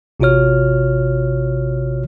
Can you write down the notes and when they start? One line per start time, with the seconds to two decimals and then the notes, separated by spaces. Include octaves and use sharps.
0.20 A1 C3 F4 F#4 C#5 F6